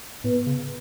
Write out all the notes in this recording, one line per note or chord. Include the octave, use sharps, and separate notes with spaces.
A2 B3
C#3